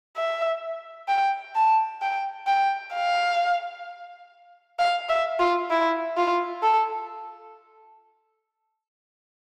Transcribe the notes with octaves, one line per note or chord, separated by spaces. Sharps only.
E5
G5
A5
G5
G5
F5
F5
E5
F4
E4
F4
A4